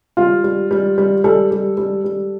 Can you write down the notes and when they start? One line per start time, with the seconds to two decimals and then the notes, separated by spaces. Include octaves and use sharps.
0.17 G3 F4
0.44 G3
0.71 G3
0.98 G3
1.24 G3 A4
1.51 G3
1.77 G3
2.04 G3